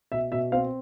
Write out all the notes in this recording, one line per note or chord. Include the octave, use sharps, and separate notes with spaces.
B2 E5
B2 E5
C4 F5